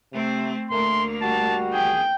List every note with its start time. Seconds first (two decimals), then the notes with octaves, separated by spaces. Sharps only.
0.13 C3 A3 C4
0.71 D2 A3 A#3 A#4 C6
1.22 G3 F#4 A5
1.74 G#4 G5